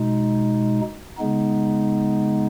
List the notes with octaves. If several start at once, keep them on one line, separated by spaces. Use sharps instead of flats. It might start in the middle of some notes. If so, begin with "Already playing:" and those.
Already playing: B2 G#3 D#4
C#3 G#3 B3 D#4